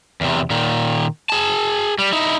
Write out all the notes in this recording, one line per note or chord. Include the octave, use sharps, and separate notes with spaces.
E2 C3
A#2 D#3
G#4 A5
G3
D#4 E4